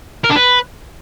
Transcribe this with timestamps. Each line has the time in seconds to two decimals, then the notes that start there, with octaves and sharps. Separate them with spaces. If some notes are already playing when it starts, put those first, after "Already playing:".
0.24 A#4
0.30 D4
0.36 B4